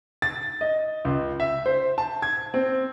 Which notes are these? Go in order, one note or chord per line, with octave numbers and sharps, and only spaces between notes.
A6
D#5
C#2
E5
C5
A5
G#6
C4